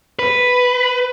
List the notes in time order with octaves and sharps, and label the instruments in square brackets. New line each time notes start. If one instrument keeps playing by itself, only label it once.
[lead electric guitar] B4